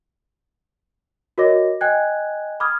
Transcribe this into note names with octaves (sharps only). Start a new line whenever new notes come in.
F#4 A#4 C#5 D#5 D6 A#6
D#5 G5 G#5 F#6 G#6
B5 D6 D#6 F6 G#6